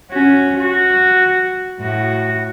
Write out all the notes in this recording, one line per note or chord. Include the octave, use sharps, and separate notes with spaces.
C#4 F#4
F#4
A2 F#4